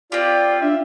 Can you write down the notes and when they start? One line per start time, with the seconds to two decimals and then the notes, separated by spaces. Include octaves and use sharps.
0.12 C4 F4 G4 D5
0.62 D4 E5